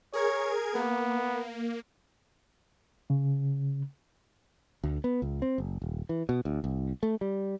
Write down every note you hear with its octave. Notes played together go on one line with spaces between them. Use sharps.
G#4 A#4 C#5 G#6
A#3 B3
C#3
D2
B3
C#2
C4
F#1
D#1
E3
B2
D2
C2
A3
G3